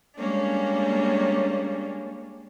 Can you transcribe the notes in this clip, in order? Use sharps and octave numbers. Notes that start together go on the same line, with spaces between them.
G3 G#3 A#3 C#4 D4